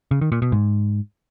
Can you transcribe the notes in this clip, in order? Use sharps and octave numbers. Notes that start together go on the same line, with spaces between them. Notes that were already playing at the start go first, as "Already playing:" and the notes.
C#3
D#3
A#2
B2
G#2